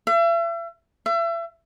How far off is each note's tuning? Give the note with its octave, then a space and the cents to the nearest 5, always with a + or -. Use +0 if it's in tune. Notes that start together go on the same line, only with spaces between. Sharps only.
E5 +40
E5 +35